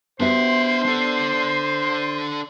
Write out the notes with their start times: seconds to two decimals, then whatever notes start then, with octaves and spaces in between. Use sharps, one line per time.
0.20 B3 D4 F#4 G4 C5 E5 C6
0.86 D4 A4